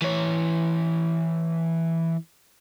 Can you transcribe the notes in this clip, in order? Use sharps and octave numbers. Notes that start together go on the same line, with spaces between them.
E3 C#5